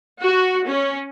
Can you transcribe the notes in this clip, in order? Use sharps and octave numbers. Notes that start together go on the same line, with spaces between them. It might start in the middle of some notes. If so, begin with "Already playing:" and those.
F#4
C#4